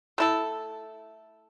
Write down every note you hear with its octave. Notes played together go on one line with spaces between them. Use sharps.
A3 E4 A4